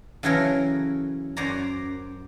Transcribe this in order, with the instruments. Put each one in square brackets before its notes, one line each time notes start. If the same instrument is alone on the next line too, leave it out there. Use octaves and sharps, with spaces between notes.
[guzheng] C#3 E3 F#3 C#4 A4 A#4
F#2 C5 D5 F#5 A#5